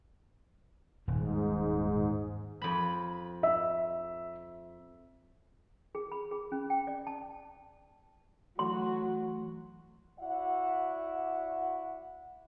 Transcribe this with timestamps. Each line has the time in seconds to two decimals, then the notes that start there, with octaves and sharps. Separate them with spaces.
1.08 D#1 G#2
2.62 F2 B5
3.43 E5
5.95 G#4
6.12 B5
6.31 G#4
6.52 C#4
6.70 G5
6.87 D5
7.07 A5
8.59 E3 F#3 A3 F#4 C6
10.20 E4 F#4 D5 E5 F#5